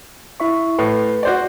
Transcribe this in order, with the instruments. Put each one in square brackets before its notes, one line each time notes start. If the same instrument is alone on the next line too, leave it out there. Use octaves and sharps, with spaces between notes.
[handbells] E4 E5 C#6
[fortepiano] A2 [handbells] B4
[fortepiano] F#4 C5 D5